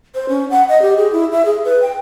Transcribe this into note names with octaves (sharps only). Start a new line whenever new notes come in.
C5
C#4
F#5
D#5
G4
G#4
E4
E5
G#4
B4
G5